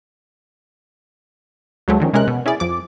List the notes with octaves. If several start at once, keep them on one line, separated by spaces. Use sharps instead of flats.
D2 F#3 G#3 A3
D3 D#3 F3 C#4
C3 G#3 C#4 A#4 F#6
B2
C#4 E4 G#4 D5
F2 D6